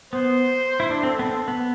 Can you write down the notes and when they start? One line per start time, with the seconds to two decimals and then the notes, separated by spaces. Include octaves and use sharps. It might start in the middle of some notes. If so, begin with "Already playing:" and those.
0.13 B3 C5
0.80 E4
0.91 D4
1.02 C4 A4
1.19 B3
1.25 C4
1.48 B3